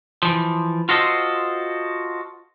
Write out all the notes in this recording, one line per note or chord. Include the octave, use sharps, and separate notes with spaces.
E3 F3
F4 F#4 A4 C5 D#5